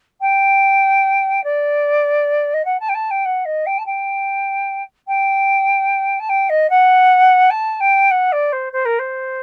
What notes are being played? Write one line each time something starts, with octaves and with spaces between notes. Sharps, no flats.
G5
D5
D#5
F#5
A5
G5
A5
G5
F#5
D#5
G5
A5
G5
G5
A5
G5
D#5
F#5
A5
G5
F#5
D5
C5
C5
A#4
C5